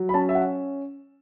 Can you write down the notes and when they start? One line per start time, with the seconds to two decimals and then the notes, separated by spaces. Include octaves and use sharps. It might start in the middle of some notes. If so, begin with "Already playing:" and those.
Already playing: F#3
0.09 B5
0.14 C#4 A5
0.29 E5
0.35 F#5